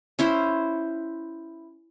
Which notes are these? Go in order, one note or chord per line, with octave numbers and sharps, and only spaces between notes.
C#4 E4 C5